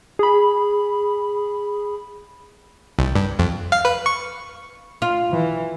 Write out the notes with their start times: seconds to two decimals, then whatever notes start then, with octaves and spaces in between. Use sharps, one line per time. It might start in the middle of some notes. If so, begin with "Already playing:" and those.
0.19 G#4 B5
2.99 C2
3.16 G2
3.39 F2
3.72 F5
3.85 B4
4.06 C#6
5.02 F4
5.31 E3